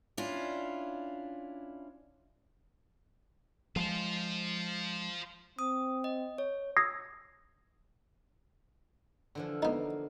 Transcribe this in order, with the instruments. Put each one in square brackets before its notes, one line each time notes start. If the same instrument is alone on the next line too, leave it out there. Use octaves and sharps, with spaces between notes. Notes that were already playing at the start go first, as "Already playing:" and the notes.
[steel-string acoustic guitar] C#4 D4 E4 F4
[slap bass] F3 G#3 [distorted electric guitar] F4 C5
[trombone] C4 [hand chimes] D#6
[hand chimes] D#5
C#5
[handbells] D#6 E6 G#6 A#6 C7
[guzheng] D3 E3 F3
[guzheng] A#3 [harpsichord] B3 D#4